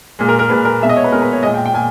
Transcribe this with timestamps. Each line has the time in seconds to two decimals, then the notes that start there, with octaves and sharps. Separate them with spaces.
0.19 A#2 G#3
0.29 A#4
0.39 A#4
0.49 A#2 G#3 B4
0.65 A#4
0.81 B2 G#3 E5
0.89 D#5
0.97 C#5
1.04 B4
1.12 B2 G#3 A#4
1.22 B4
1.33 C#5
1.43 G#3 D#5
1.47 A#2
1.54 G5
1.66 G5
1.74 A#2 G#5